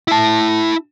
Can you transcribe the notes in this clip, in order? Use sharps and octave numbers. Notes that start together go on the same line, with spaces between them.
E4 A5